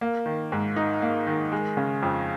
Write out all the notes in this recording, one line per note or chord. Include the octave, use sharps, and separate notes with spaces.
A#3
D#3
G#2
D#4
A#3
D#3
G#3
C#3
F2